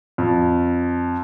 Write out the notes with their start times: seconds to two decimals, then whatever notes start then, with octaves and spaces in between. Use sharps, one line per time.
0.18 F2